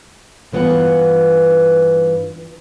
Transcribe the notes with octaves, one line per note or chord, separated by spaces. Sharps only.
G2 E3 B3 F4 F#5